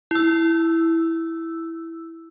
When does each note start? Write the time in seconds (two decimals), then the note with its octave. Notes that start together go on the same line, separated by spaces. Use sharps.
0.11 E4 E6